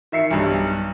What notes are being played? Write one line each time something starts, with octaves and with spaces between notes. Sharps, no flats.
D#3 E5 C7 C#7
B1 G2